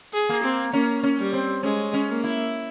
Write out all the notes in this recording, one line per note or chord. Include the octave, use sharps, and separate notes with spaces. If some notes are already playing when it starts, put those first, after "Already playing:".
G#4
A#3
C4
A#3 C#4
C#4
G3
C4
G#3 C#4
C#4
A#3
E4